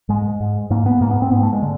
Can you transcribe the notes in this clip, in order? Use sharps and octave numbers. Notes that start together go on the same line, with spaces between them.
G#2 G#3
G#2
G#2 A#3
B3
G#2 A#3
B3
C4
G#2 B3
A3
G#3
D3